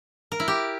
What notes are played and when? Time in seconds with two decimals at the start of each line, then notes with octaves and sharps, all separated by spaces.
0.32 A#4
0.40 E4
0.48 G4